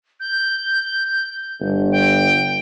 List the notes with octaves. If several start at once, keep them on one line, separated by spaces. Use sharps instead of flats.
G6
G1
G5